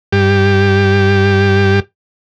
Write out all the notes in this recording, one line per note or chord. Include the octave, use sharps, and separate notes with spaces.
G2 G4